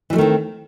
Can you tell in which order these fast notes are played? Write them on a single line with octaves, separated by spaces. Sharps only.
E3 G3 A3 D#3 C4